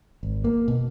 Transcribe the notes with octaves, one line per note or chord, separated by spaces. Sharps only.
G#1
A#3
B2